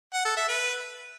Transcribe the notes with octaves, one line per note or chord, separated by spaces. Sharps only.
F#5
A4
E5
B4